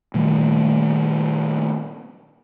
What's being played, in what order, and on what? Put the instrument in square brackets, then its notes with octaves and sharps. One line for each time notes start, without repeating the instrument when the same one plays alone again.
[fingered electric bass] A#2 D#3 G3 A3